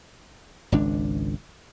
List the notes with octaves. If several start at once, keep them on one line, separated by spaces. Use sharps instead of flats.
G#1 C#2 D4